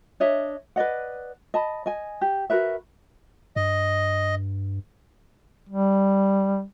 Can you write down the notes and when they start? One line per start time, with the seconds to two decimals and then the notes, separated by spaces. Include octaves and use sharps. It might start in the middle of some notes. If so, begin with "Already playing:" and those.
0.20 D4 C#5 D#5 E5
0.76 B4 D5 D#5 F#5
1.54 D#5 A5 B5
1.86 D#5 G#5
2.21 G4
2.50 F#4 A#4 B4 E5
3.56 G2 D#5
5.69 G3